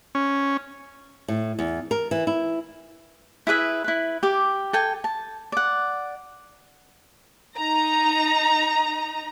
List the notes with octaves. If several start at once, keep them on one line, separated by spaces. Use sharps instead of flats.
C#4
A2
E2
A#4
E3
E4
E4 G#4 B4 E5
E4 B4
G4 D6
A4 G5 G#5
A5
D5 F#5
D#4 A#5